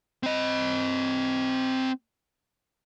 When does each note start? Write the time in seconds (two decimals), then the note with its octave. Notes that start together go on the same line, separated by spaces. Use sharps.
0.23 C4 D#5